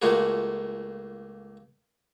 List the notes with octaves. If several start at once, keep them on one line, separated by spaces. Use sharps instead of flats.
C#2 A3 A#3 F4 F#4 G#4